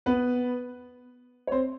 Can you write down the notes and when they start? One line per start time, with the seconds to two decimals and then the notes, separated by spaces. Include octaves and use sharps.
0.06 B3 B4
1.47 C#5
1.52 C4 C5